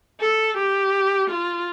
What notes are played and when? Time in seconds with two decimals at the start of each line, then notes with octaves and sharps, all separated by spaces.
0.20 A4
0.57 G4
1.30 F4